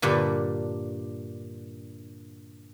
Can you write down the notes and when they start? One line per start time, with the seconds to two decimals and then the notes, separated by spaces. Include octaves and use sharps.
0.02 G2 A#2 D3